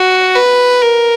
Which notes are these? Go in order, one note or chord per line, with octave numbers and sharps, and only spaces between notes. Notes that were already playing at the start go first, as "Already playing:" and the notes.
Already playing: F#4
B4
A#4